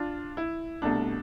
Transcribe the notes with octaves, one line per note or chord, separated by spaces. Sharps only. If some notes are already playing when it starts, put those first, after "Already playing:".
Already playing: D4 F4
E4
C2 B2 A3 D4